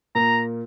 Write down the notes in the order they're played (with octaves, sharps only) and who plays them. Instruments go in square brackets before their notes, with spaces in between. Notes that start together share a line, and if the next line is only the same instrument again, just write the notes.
[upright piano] A#2 A#3 [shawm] A#5